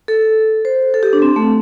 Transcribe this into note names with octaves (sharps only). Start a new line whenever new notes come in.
A4
C5
A4
G4
D4
C4
A3